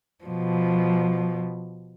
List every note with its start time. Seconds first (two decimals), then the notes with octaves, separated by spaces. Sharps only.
0.25 B2 F3